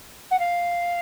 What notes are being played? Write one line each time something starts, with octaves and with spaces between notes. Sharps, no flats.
F#5
F5